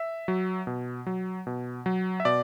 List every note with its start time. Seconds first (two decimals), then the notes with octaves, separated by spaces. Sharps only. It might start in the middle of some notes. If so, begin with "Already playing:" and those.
Already playing: E5
0.28 F#3
0.67 B2
1.07 F#3
1.47 B2
1.86 F#3
2.20 E5
2.25 B2 D5